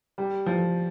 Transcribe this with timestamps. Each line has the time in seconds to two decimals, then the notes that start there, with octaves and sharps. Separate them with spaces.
0.18 G3
0.46 F3